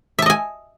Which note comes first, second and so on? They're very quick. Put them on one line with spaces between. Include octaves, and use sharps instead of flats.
E5 A5 D#5 G#5